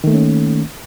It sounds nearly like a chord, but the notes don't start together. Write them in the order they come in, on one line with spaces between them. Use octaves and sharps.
D#3 A3 A#3 C#4